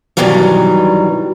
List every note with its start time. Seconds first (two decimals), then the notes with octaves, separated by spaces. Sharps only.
0.17 G2 B2 D#3 E3 F#3 G3